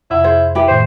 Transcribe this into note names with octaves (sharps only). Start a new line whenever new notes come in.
F2 C3 E4 F#5
G#4 C5 E5
E4 G4 B4
A2 D#3 A3 C5